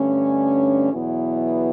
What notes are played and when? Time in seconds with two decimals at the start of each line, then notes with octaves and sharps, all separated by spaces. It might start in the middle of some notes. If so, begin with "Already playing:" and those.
Already playing: G2 D3 A3 C#4
0.91 E2 B2 F#3 B3 E4